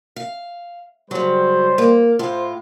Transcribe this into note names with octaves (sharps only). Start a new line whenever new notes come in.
F5
C#3 F#3 G3 C5
A#3
A2 F4 C5